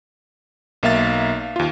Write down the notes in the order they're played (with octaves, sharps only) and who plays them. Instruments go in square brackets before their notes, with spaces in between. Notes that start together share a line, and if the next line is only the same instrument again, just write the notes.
[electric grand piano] B1 A#3 E5 F5 A6
D#2 F4